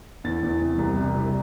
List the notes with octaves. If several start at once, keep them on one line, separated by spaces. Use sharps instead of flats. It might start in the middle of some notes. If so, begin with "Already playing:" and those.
E2 A6
E2
C3
C2
C3
C2